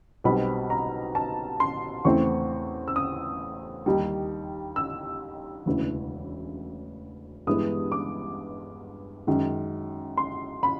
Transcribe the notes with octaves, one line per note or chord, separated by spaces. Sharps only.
B1 B2 G3 C4 B5
A#5
A5
C6
E2 C#3 E3 A3 C4 C#6
E6
D#6
D#2 D#3 G3
E6
E1 D2 C#3 E3
G2 E3 G#3 B3 D#6
D6
F#2 D#3 G#3
C6
B5